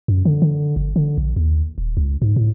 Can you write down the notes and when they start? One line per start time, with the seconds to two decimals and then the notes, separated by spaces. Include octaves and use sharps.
0.08 F#2
0.25 D3
0.42 D3
0.76 G1
0.96 D3
1.17 A#1
1.36 D#2
1.78 D#1
1.97 C#2
2.22 G#2
2.36 A2